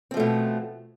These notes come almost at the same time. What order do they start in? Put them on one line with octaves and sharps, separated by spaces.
C4 F3 A3 B2